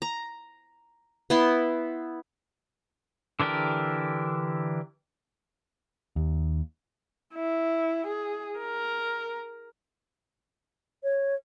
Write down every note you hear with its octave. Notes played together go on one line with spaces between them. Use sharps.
A#5
B3 E4 C6
D3 E3 D4 G4 A#4
D#2
E4
G#4
A#4
C#5